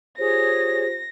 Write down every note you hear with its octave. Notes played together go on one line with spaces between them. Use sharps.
F4 G4 G#4 C5 C#5 A#6